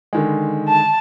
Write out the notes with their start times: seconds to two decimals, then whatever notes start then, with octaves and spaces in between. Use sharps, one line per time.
0.13 D3 D#3 G#3
0.68 A5